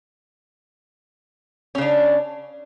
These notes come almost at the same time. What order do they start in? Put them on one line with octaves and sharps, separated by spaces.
C#4 C#3 D4